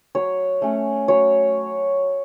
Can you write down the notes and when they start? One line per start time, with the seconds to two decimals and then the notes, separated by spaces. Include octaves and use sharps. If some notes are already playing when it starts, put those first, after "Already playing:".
0.15 F#3 C#5
0.62 A3 C#4
1.08 F#3 C#5